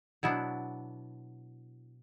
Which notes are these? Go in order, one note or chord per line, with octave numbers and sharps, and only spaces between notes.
B2 F#3 B3 D4 E4